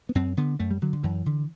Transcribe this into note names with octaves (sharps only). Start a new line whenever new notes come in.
B3
F#2 C4
D3 B3
F#2 A3
G3
D3 F#3
D3
F#2 E3
D3